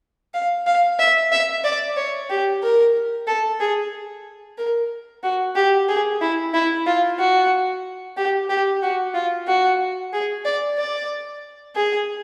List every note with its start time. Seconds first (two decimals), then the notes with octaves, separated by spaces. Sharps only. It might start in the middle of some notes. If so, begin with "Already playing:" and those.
0.34 F5
0.67 F5
0.99 E5
1.32 E5
1.64 D5
1.96 C#5
2.30 G4
2.63 A#4
3.27 A4
3.60 G#4
4.58 A#4
5.23 F#4
5.56 G4
5.89 G#4
6.21 E4
6.54 E4
6.86 F4
7.19 F#4
8.17 G4
8.49 G4
8.82 F#4
9.14 F4
9.48 F#4
10.13 G#4
10.45 D5
10.78 D5
11.76 G#4